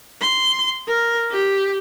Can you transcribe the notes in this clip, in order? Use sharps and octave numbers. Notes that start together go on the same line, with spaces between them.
C6
A#4
G4